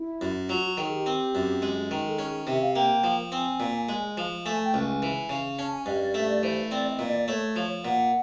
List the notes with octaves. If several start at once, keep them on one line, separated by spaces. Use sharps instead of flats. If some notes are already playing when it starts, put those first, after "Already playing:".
Already playing: E4
F#2
F#3 F4
F#4
D#3 G#4
G4
C4
F#2
G#3
D#3
A4
C#4 G#4
C3 E5
F5
A#3 G5
F3
C4 G#5
A#2
G#3
F3
A3 G#5
G5
C#2
G#5
E3
C#3
C#4 A5
G#5
G2 D#5
D5
A3 E5
D5
E3 C5
C4 D5
D#5
A#2
D#5
D5
A3 C#5
F3
A#2 F#5